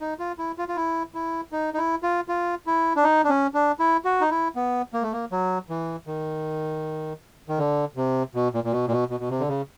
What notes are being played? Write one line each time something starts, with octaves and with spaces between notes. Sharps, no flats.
D#4
F4
E4
F4
F4
E4
E4
D#4
D#4
E4
F4
F4
E4
D4
D#4
D4
C#4
D4
E4
F#4
D#4
E4
B3
A#3
A3
A#3
F#3
E3
D#3
D#3
D3
C3
B2
A#2
A#2
B2
A#2
B2
B2
B2
C3
D3
C#3